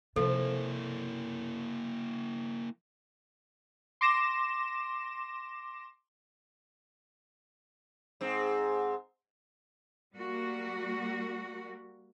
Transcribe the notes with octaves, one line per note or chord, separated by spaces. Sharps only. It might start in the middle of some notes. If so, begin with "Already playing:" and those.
C3 F3 A#3 E4 A4
C6 D6 A#6 E7
G#2 C4
G3 A#3 F#4